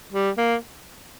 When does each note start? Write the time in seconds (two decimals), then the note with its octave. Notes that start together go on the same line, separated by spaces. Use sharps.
0.13 G3
0.38 A#3